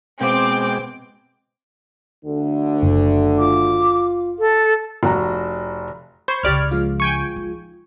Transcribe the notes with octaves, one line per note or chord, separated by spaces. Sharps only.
B2 G#3 C4 G5 D6
D2 D3
F#1
F4 D6
A4
F1 F#4 A#5
C5 B5 C#6 G#6
C#2 C#3 G4 D5 F6
F3 G#3 F4
G5 G#5 C#6
D#4